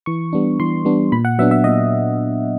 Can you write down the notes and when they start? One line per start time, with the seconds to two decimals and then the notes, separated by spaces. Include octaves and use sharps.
0.06 E3 C#6
0.33 G3 B3 D4
0.60 E3 C6
0.85 G3 B3 D4
1.12 A#2 B5
1.25 F#5
1.39 F#3 B3 D4 E5
1.51 E5
1.64 A#2 D#5